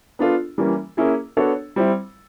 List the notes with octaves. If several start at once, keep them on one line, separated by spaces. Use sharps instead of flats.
B3 D4 F4 A4
E3 G3 A#3 C#4
A#3 C#4 E4 G#4
B3 D4 F#4 A4 C#5
G3 C4 E4